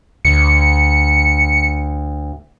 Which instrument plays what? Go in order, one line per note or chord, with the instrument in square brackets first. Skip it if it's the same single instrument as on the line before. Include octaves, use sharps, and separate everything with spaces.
[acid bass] D2 [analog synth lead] C#7